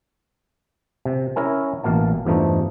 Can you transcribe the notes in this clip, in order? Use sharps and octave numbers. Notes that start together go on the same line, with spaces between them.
C3
C#4 E4 A#4 G#5
A1 B2 A#3 F5 A5
E2 G2 F3 A3 D#4